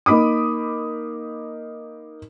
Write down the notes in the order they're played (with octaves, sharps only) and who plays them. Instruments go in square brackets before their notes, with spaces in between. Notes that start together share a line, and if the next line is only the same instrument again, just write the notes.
[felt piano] A#3 D#4 B5 D6 D#6